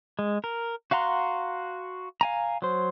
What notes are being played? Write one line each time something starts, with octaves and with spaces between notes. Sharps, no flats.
G#3
A#4
F#4 F5 F#5 A#5 C6
F5 G#5 A#5
F#3 C5